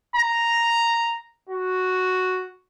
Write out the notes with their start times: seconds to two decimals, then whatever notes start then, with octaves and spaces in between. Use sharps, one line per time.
0.16 A#5
1.49 F#4